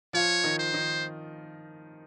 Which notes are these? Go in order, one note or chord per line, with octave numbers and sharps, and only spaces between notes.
F3 F4 C#5
D#3 D#4
C5
D#3 D#4